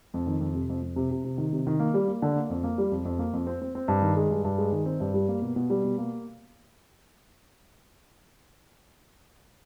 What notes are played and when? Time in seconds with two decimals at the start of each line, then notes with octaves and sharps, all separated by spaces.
0.14 F2
0.27 D#3
0.40 F2
0.55 C3
0.69 F2
0.82 F2
0.96 C3
1.11 C3
1.24 C3
1.38 D#3
1.53 C3
1.67 D#3
1.80 A#3
1.94 G3
2.08 A#3
2.22 D3
2.36 A#3
2.50 F2
2.64 A#3
2.78 G3
2.91 F2
3.05 F2
3.19 A#3
3.33 F2
3.47 C4
3.62 C4
3.75 C4
3.88 G2
4.02 D#3
4.16 G#3
4.31 G2
4.44 G2
4.58 G#3
4.72 D#3
4.86 C4
5.00 G2
5.14 G3
5.28 A#3
5.42 B2
5.56 B2
5.70 G3
5.84 B2
5.98 A#3